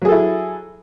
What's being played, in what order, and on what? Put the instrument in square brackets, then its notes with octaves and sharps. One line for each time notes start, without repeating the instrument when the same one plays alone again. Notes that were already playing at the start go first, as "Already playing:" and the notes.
[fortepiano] F#3
G#4
A4
E4